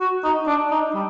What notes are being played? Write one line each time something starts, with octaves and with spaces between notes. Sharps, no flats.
F#4
D#4
D4
D#4
G3